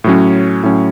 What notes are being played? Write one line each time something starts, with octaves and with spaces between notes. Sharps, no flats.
A2 F#3 C#4
A2 F#3 C#4